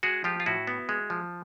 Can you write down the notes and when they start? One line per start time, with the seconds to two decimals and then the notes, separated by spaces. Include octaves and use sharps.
0.03 G#3 F#4 G#4
0.24 F3 F4 G4
0.40 F4
0.46 A2 E4 F#4
0.67 B3
0.89 G#3
1.10 F3